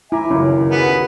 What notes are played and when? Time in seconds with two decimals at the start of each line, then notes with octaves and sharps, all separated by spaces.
0.12 E4 E5 G#5 A#5 D6
0.31 C#2 F#2 D#3 C#4 E4
0.71 D#2 B3 F#4 G#4